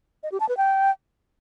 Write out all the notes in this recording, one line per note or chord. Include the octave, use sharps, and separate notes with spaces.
D#5
G4
A5
B4
G5